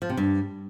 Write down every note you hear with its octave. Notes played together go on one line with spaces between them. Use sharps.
F3
C3
G2